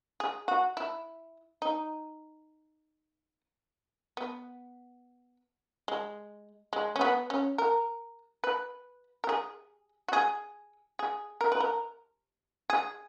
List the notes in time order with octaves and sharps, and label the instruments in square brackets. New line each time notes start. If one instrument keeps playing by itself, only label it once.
[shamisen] G#4
F#4
E4
D#4
B3
G#3
G#3
C#4
B3
C#4
A#4
B4
A#4
G#4
F#4
G#4
G#4
A#4
B4
A#4
G#4